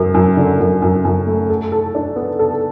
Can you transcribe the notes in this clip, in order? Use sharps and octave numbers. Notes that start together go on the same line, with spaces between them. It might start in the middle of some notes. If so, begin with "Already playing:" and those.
Already playing: F#2 F#3
F#2
D3
F#2
F#2
F#2
A3
A4
A4
D4
B3
A4